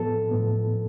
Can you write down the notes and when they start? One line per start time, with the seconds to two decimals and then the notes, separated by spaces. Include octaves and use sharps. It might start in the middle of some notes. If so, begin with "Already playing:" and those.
Already playing: A2 F3 B3 A4
0.31 A2 F3 B3